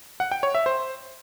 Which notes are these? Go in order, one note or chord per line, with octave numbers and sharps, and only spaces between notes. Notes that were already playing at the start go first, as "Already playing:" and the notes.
F#5
G5
C#5
E5
C5